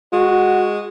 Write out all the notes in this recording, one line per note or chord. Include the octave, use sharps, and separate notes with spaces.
G#3 F#4